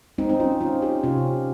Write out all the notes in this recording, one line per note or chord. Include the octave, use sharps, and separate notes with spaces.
G#3 C4 D#4
D#4
C#4 F4
G#3 C#4 F4
D#4 G4
C3 C#4 F4